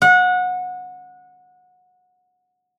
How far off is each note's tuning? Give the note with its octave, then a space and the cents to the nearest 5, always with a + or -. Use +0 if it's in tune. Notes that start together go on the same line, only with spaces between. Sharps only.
F#5 -25